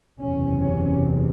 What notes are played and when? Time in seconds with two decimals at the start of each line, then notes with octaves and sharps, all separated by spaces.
0.20 F#1 E2 C3 C#4
0.62 C#4